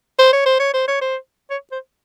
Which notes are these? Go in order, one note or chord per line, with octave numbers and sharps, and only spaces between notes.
C5
C#5
C5
C#5
C5
C#5
C5
C#5
C5